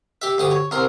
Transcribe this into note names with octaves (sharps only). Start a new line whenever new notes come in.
G4 E5
D2 G4 D#6
C#5
C2 A#4 C6